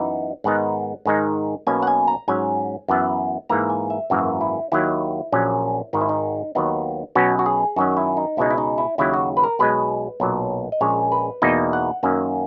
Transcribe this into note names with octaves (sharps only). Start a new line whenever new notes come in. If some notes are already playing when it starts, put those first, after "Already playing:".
Already playing: F#2 E3 B3 D#4
G#2 D#3 G#3 B3 D#4 F#5
G#2 D#3 G#3 D#4
B1 B2 A#3 C#4 G#5
F#5
G#5
A#5
G#2 F#3 C#4 G#5
F#2 E3 B3
G#2 E3 A#3 A#5
G#5
E5
G#1 F#2 E3 A#3 F#4
E4
D#2 D#3 F#3 E4
A#1 A#2 F#3 C#4
G#1 G#2 D#3 D#4
E4
D#4
D#2 D#3 F#3 B3 D#4
B1 B2 F#3 C#4 F#4
F#4
G#4
F#2 D#3 F#3 C#4 F#4
E4
D#4
C#2 B2 G#3 D#4 E4
E4
D#4
E4
D#2 C#3 F#3 E4
F#4
B4
A#4
B1 B2 G#3 B4
B1 A#2 F#3
D#5
A#1 A#2 G#3 C#4 C#5
B4
E2 B2 A#3 D#4 D#5
F#5
F#2 D#3 A#3 C#4